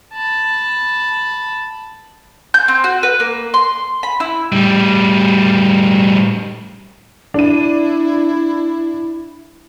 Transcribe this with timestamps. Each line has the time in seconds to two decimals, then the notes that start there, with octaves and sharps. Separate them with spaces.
0.13 A5 B5
2.54 G6
2.68 C4
2.84 F#4
3.03 B4
3.20 A#3
3.54 C6
4.03 B5
4.20 E4
4.52 A2 G3
7.34 D4 E4 D#7